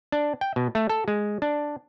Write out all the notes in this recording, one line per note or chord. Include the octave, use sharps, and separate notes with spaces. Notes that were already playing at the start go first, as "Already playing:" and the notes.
D4
G5
B2
A3
A4
G#3
D4